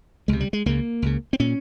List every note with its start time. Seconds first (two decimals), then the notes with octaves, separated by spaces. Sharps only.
0.28 C#2 C3 G#3
0.40 G3
0.53 G#3
0.66 C#2 C#3 A#3
1.02 C#2 C#3
1.33 C4
1.40 A#2 C#4